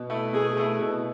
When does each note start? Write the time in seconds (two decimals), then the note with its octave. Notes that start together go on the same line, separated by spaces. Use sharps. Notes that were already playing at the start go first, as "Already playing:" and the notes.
Already playing: B2
0.10 A3 E4
0.33 B2 G#4
0.57 A3 E4
0.81 B2